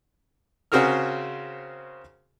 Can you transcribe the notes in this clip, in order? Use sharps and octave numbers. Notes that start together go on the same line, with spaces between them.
C#3 C4 F#4 G#4 A#4 F6